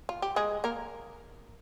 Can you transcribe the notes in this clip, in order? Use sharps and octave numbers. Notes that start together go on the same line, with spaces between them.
F4
G4
G#3 G#4
A#3 A#4